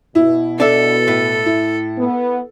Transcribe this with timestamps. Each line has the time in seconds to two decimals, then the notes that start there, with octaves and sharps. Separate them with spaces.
0.15 B2 E4
0.60 D4 A4 E5
1.08 A2
1.46 E4
1.97 B3